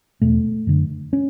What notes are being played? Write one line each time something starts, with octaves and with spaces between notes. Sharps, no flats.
E2 B2 A3
F#2 D3
C#4